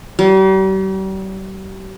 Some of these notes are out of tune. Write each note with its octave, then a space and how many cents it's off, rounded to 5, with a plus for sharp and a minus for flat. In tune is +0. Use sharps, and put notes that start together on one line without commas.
G3 -40